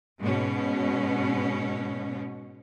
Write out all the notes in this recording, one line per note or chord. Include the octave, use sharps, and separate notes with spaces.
G#2 B2 C#4